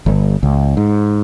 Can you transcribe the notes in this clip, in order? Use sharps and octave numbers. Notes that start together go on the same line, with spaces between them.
G1
C#2
G#2